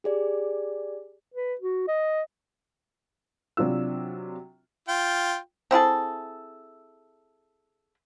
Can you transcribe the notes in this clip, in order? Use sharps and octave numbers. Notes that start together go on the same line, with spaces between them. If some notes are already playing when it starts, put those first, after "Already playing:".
G4 G#4 D5
B4
F#4
D#5
C3 F#3 D4 F4 E6
F4 G5
C4 E4 G#4 A4